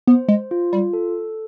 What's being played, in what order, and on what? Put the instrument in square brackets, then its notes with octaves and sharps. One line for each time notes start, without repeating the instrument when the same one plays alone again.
[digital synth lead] B3 [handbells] C5
[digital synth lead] G#3
[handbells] F4
[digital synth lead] G3
[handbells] A4